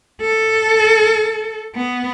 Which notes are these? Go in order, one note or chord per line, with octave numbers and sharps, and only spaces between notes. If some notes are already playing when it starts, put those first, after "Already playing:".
A4
B3